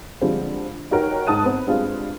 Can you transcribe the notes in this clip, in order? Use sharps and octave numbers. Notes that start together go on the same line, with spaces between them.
D3 F3 G3 G#3 C4 F4
D#4 F#4 G4 A#4 C#5 G5
G#2 G#3 A5 D#6 F#6 D#7
B3 C4
G2 G3 G#3 C4 F4